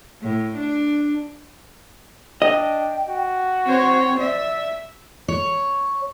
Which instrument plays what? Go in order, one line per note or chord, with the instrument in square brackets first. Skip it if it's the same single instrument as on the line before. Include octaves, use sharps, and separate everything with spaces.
[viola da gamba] A2
D4
[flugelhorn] D4 [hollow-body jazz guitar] D#5 [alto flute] G5
[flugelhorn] F#4
[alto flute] C4 [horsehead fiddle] C5 C#5
[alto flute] D5 [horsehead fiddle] E5
[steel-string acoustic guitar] C#5